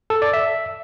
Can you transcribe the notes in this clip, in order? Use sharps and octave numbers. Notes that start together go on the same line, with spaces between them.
A4
D5
E5